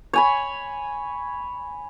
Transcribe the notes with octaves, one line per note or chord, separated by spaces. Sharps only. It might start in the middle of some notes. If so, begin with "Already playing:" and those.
C#5 G#5 B5